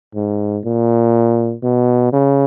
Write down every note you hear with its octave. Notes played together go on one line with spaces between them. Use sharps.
G#2
A#2
B2
C#3